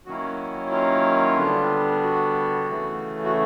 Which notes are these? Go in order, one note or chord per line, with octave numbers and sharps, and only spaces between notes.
D#3 F#3 A#3 C#4 E4 F#4
F4
D3 G3 B3 D4
F#4
C#3 E3 A3
F#4